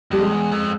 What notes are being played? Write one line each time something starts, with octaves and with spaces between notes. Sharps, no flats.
F2 G3
G#3
E2
F2